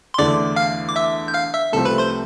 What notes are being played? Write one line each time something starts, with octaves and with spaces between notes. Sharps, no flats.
C6
E2 D3 A3 D5 D6
F5 F6
D6
E5 E6
G6
F5 F6
E5 E6
C2 C3 F3 A3 C4 A4 A5
B4 B5
C5 C6